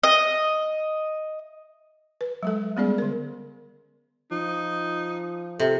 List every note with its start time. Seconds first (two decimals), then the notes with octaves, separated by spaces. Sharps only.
0.03 D#5
2.21 B4
2.43 F#3 G#3 A4
2.77 G3 G#3 B3 C#4 G#4 D5
2.98 D3 A#4
4.31 F3 D#4
5.60 C3 A4